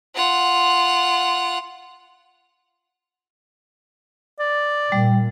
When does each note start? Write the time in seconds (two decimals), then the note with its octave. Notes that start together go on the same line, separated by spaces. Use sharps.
0.15 F4 F#5
4.40 D5
4.92 A#2 G3